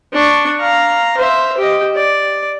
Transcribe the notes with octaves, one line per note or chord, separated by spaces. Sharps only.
D4 C#6
F5 A#5
C5 E5
G4 D#5
D5